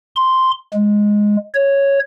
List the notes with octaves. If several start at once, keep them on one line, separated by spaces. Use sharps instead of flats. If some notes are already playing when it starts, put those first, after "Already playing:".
C6
G#3
C#5